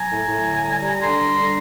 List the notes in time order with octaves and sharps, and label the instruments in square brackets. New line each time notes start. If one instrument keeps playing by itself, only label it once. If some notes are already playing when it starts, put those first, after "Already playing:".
Already playing: [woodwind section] F#3 G#5 A#5
A2
A2
D3
G3
G3
D3 A#5 C6
G3
D3